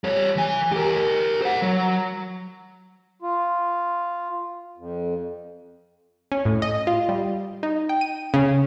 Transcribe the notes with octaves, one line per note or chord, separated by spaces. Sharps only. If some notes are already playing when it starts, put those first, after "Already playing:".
G3 C#5
E3 G#5
G4 A#4
C5 F#5
F#3
F4
F2
C#4
A2
D#5
F4
G3
D#4
G5
D#7
C#3